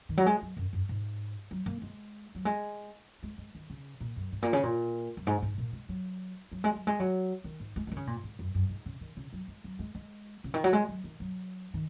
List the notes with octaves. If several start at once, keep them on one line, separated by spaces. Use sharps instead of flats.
D#3
F#3
G#3
F#3
F#2
F#2
G#2
F#3
A#3
G#3
F#3
G#3
G#3
G#3
D#3
C#3
A#2
F#2
G#2
A#2
C#3
A#2
F#2
G#2
G#2
A#2
G#3
F#3
F#3
G#3
F#3
G#3
F#3
D#3
G#2
G#3
G#3
D#3
C#3
A#2
G#2
F#2
F#2
G#2
C#3
D#3
C#3
F#3
G#3
F#3
G#3
G#3
C#3
D#3
F#3
G#3
F#3
D#3
F#3
D#3